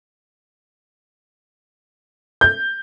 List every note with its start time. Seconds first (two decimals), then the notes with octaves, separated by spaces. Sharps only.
2.41 G6